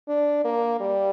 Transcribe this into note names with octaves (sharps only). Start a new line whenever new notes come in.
D4
A#3
G3